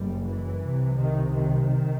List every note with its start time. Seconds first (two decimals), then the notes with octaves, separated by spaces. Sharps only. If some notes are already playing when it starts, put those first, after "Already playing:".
Already playing: F#1 F#2 G3
0.24 E3
0.61 C2 C3
0.98 D#3
1.34 D#3